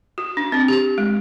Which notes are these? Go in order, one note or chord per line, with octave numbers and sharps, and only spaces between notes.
F#4
D4
C4
G4
G#3